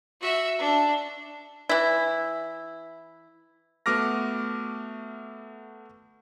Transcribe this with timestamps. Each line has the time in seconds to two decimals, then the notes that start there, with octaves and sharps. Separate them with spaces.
0.21 F#4 E5
0.59 D4
1.69 E3 E4
3.86 A3 B3 F#4 D6 F6 A#6